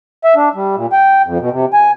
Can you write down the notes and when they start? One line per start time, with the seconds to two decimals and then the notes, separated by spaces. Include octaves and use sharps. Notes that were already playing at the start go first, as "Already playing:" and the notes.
0.24 E5
0.36 D4
0.55 G3
0.76 A#2
0.92 G5
1.25 F2
1.39 B2
1.51 C3
1.73 G#5